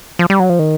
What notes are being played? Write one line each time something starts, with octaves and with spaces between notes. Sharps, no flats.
F3
G3
F#3
F3
D#3